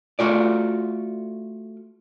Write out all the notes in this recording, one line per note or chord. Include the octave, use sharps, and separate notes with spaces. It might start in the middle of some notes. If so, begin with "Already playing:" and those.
A3 F4 F#4 D5